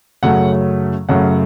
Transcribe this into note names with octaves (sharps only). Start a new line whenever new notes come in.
F#2 C#3 F#3 A3 F#5
F#2 C#3 F#3 A3 F#5